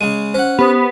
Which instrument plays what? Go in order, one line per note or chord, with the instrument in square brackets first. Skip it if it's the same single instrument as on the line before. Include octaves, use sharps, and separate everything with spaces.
[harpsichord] C#3 G#3 [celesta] D#7
[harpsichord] C#4 F#5 [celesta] C5
[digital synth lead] B3 [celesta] G4 C5